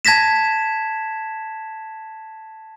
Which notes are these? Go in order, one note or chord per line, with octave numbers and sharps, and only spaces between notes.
A5 G#6 A#6 B6 E7